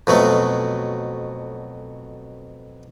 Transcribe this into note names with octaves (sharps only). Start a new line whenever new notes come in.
F2 B2 F#3 A3